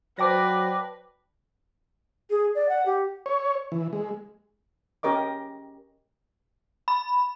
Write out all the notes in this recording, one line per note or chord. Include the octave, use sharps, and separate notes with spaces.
F#3 B4 C5 D5 G5 A5 D6 A#6
G#4
D5
F#5
G4
C#5
E3
G#3
C#4 G4 A#4 D#5 D6
B5